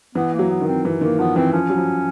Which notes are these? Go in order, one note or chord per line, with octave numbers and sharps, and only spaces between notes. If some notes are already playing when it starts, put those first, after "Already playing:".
E3 B3
A#3
F#3
B3
D#3
C4
E3
D#3 A#3
F3 B3
E3 C4
F3 C#4
F#3
F3